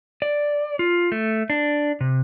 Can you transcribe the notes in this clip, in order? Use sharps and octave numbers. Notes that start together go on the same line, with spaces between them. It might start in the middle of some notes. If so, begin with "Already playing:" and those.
D5
F4
A3
D4
C3